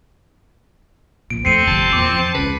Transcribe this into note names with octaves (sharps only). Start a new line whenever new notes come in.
A#1 A#2 D7
F2 A3 C4 C7 C#7 D#7
G1 F2 C3 A5
E2 A#2 D6
F2
C#2 C#3 B4